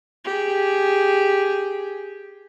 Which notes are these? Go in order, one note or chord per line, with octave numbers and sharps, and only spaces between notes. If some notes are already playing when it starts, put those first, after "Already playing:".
G4 G#4